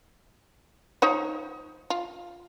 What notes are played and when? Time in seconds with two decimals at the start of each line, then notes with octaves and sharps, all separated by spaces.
1.02 F3 D#4 C#5
1.90 F4